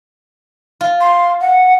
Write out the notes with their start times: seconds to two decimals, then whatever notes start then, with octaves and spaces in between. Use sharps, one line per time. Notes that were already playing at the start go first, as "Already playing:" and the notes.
0.81 F4
1.01 C6
1.41 F#5